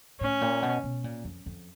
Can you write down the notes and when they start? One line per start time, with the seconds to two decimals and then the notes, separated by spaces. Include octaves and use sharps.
0.21 A2 C#4
0.41 A#2
0.62 B2
0.83 B2
1.04 A#2
1.24 F2
1.46 F2